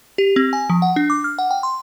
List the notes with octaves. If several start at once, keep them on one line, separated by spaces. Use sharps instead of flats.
G4
C4
G#5
F3
F#5
D4
D6
F6
F#5
G5
C6